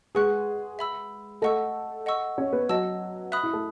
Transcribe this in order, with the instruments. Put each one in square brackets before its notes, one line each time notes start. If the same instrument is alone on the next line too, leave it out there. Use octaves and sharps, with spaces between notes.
[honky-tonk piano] G#3 G#4 [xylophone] B4 F#5 C#6 F#6
[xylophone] E5 B5 E6
[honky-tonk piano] A3 A4 [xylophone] D#5 F#5 C#6 E6
[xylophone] D#5 F#5 C#6 E6
[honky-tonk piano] C#4 C#5
B3 B4
[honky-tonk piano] F#3 F#4 [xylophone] D#5 A5 E6
[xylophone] E5 B5 D#6 F#6
[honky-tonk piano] E4
A3 A4